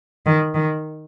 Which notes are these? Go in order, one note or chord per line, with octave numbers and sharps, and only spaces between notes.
D#3
D#3